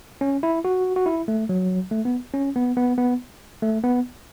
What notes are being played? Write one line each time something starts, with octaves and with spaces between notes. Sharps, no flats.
C#4
E4
F#4
F#4
E4
A3
F#3
A3
B3
C#4
B3
B3
B3
A3
B3